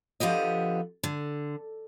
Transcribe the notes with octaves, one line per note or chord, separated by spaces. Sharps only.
D3 F3 B3 G4 D#5
D3